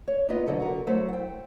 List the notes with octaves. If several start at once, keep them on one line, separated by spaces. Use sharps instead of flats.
C#5
A#3 B3 E4 F4 B4 D#5
F2 A#2 D3 F#3 A4 B4
F#4 A#4
F#3 A3 E4 C5
F#5 G5